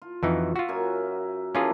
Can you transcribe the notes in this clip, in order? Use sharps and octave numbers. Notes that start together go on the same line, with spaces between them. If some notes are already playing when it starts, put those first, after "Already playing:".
F4
F2 E3 D#4 F4 F#4
F4 F#4 E5
F#2 A#4 G#5
E3 A#3 C#4 F4 G#4 A4